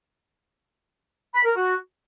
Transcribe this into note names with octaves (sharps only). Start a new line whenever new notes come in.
B5
A#4
F#4